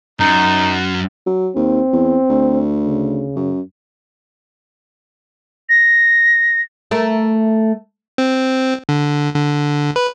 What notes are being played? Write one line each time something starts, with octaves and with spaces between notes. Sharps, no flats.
F#2 D#4
F#3
D#2 C4
E2
D2
C#3
F#2
A#6
A3 A#4
C4
D3
D3
B4